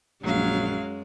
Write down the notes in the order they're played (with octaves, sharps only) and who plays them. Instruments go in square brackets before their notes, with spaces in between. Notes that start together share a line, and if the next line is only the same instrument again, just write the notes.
[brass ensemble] A#1 [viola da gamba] F#2 G#3 [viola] F#3 F5